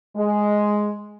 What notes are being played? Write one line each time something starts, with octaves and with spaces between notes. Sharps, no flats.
G#3